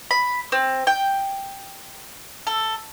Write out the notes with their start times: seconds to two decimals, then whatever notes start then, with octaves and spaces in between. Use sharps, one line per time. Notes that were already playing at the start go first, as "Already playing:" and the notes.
0.11 B5
0.52 C4
0.87 G5
2.47 A4